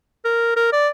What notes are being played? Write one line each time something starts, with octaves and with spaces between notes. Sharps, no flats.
A#4
A#4
D5